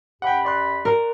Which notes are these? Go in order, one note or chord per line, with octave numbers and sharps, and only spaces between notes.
F#2 G4 F#5 G5 B5
D5 C6 F#6
A#4